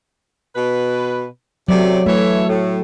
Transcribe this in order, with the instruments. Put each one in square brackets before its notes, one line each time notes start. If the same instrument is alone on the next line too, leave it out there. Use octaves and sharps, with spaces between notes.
[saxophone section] B2 B4
[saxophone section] C3 A3 D5 [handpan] F#3
[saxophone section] E3 C#5 E5 [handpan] A3
[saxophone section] A2